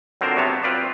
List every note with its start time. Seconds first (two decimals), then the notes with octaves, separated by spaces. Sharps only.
0.21 D3 F#3 C4 F4 A#4 C5
0.36 C3 F#3 B3 C#5 E5 A5
0.63 C4 F4 B4 D5